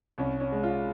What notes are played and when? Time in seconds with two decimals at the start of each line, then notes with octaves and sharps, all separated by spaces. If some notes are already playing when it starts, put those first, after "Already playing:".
0.18 C2 C#4
0.40 C#4
0.52 G#3
0.63 F4